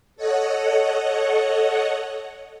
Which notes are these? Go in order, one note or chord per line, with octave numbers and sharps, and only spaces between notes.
A4 C#5 D#5 F#5